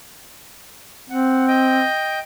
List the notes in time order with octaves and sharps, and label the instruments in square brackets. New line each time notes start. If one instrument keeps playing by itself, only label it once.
[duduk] C4 [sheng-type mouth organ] F#5
[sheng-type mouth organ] D#5 G5